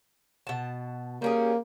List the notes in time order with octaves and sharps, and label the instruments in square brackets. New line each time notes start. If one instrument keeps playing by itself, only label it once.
[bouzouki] B2 A5
[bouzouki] G3 C#4 G#4 [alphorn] A#3